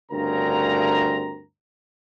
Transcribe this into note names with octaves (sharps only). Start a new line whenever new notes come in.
D2 G2 C#3 C4 A#4 A#5